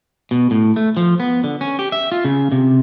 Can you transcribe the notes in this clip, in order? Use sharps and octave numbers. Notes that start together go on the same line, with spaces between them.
B2
A2
A3
F3
B3
D3
C#4
G4
E5
F4
C#3
C3